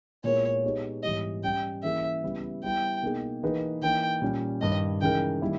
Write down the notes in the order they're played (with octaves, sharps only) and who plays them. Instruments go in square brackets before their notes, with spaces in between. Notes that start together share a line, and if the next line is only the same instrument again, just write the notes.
[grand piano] A#2 G#3 B3 E4 A#4 [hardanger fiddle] C#5
[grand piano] G#3 B3 D#4 G4 C#5
[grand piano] G#2 E3 G3 B3 G4 [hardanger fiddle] D#5
[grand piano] G3 C#4 G4 [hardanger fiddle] G5
[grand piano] E3 A#3 C#4 E4 G#4 [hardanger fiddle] E5
[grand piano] C#3 G3 B3 E4
[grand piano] G3 B3 E4 [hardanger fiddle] G5
[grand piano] B2 A#3 D#4 G#4
E3 A#3 D#4 G#4 B4
[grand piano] E3 A#3 D#4 [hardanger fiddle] G5
[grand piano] A#2 G3 C#4
[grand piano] G2 D#3 G3 [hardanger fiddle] D#5
[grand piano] C#3 E3 G#3 D#4 A#4 [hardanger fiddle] G5
[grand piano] D#3 G3 A#3 E4